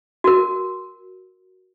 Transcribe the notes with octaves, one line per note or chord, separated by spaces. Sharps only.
F#4 A#4